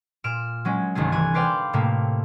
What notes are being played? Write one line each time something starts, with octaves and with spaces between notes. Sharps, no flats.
A#2 F6 D7 E7
F#3 G#3 C#4
G1 C2 D#3 A3 G#4
E3 G#5 F#6
B4 C5 D5 F5 G5
A2 C3 A3 A#3